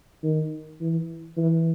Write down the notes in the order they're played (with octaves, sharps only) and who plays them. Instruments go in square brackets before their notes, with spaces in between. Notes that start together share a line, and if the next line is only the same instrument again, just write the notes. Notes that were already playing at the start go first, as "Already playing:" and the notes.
[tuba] D#3
E3
E3